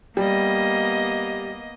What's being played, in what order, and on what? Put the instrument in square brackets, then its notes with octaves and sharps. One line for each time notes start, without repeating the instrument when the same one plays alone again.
[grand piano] G3 [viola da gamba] A#3 B3 D#5